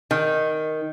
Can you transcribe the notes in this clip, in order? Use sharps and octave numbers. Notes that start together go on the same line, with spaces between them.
D#3